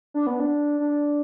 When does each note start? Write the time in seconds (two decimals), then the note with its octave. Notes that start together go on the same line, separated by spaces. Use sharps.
0.14 D4
0.27 B3
0.40 D4
0.80 D4